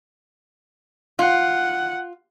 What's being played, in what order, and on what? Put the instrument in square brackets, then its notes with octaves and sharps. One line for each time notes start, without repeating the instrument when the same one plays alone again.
[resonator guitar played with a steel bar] F4 [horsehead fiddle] F#5